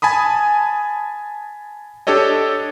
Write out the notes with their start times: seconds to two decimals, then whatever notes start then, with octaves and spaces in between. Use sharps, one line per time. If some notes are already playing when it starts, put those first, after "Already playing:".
0.02 G#5 A5 B5 D#6
2.07 D4 G4 A4 C#5 D#5